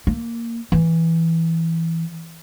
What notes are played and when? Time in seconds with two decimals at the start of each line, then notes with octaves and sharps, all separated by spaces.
0.07 A#3
0.72 E3